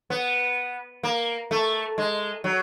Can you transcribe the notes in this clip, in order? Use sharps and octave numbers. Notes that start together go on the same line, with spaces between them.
B3
A#3
A3
G#3
F#3